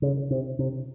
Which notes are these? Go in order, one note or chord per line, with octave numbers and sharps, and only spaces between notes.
C#3
C3
C3